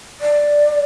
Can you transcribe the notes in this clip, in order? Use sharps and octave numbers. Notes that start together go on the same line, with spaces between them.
D5